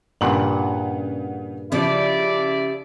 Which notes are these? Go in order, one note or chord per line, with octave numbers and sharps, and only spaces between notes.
G2 A#2 C#3 F#5 F#7
C#3 F3 G3 E4 B4 D5